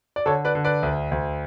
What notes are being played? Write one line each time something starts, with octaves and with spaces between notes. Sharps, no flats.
D5
D3 A4 C#5
B4 D5
D3
B4 D5
D2
D2